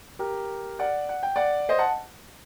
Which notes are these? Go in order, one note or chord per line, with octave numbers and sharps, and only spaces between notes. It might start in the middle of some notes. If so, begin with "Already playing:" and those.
G4 A#4
D5 F#5
F#5
G5
D5 F#5
C5 D#5
F#5 A5